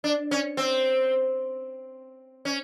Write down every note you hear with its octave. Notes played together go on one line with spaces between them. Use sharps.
D4
C#4
C4
C#4